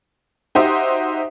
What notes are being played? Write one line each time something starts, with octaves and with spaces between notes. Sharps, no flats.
D#4 F#4 G4 C5 E5